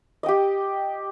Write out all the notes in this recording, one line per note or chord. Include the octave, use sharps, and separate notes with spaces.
G4 D#5 G5